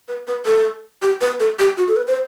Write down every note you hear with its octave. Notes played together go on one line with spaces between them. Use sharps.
B4
B4
A4
G4
B4
A4
G4
F#4
A4
B4
C5